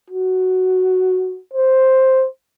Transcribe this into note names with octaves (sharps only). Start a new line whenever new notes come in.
F#4
C5